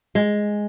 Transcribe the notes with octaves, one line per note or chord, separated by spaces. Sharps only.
G#3